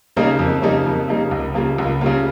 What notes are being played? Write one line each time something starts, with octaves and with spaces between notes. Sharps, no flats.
C#3 G3 A#3 D#4
F2
C#3 G3 A#3 D#4
F2
C#3 G3 A#3 D#4
C#2
C#3 G3 A#3 F4
C#2
C#3 G3 A#3 F4